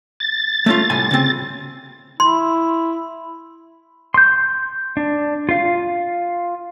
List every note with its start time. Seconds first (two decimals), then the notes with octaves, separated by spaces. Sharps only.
0.20 A6
0.66 A3 C#4 F4
0.90 C2 A2 G#5
1.11 C#3 C4
2.20 E4 C6
4.14 C6 G6
4.97 D4
5.49 F4 F5